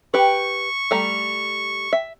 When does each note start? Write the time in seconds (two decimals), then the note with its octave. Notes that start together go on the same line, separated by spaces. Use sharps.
0.14 G4 B4 C#6
0.91 G3 A3 A#5
1.93 E5